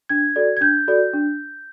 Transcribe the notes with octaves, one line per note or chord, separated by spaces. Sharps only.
D4 G#6
F#4 A4 D5
G#6
D4 G6
F#4 A4 D5
D4